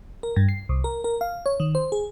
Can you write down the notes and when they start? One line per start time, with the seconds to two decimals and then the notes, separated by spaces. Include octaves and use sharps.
0.23 A#4
0.36 G2
0.49 C7
0.69 C2
0.84 A#4
1.04 A#4
1.21 F5
1.46 C#5
1.60 D#3
1.75 C5
1.92 G#4